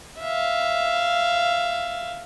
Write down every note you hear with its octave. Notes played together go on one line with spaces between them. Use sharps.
E5 F5